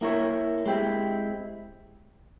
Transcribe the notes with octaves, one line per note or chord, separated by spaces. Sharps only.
A#3 E4 A#4 C#5
G#3 C4 E4 G4